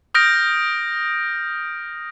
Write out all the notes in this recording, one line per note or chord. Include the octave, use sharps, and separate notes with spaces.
D#6 F6 G6 A#6 D7